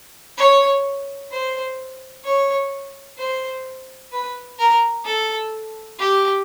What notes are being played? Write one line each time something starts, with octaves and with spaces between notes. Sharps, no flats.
C#5
C5
C#5
C5
B4
A#4
A4
G4